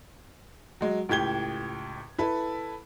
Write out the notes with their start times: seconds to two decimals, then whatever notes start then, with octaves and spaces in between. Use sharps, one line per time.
0.81 F#3 G#3
1.09 C#2 A2 G4 G#6 G7
2.18 E4 A4 B4